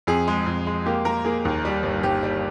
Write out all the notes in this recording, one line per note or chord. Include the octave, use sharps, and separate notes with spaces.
F2 G#4
G#3
F2
G#3
A#3 G4
A#3 A#4
A#3 G#4
D#2
G3
G1
G1 G4
G3